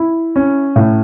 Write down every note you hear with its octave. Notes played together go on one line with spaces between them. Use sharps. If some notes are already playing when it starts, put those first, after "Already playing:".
Already playing: E4
C#4
A2